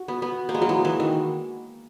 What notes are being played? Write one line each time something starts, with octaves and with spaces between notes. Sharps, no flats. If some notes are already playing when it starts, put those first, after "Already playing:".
Already playing: F#4
B3
B3
A#3
G#3
F#3
E3
E3
D#3